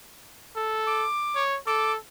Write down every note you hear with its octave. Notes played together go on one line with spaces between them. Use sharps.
A4
D6
C#5
A4 D6